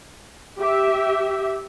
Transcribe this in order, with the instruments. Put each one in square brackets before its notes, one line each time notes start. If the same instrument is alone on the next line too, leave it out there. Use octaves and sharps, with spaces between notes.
[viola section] G4 E5